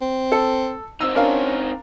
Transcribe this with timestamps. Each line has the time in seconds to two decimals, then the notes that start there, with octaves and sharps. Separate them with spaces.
0.01 C4
0.32 A4
1.01 C4 D#4 E6
1.15 C#4 D4 A#4 F5